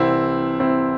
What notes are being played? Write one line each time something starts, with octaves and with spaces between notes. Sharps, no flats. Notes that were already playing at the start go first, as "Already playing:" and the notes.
Already playing: C2 C3 E3 C4 E4
C4 E4